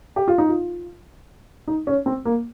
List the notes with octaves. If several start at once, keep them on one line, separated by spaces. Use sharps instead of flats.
G4
F4
D#4
F4
D#4
C#4
C4
A#3